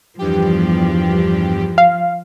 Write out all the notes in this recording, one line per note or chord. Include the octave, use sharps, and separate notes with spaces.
E2 G2 F3 G4
F5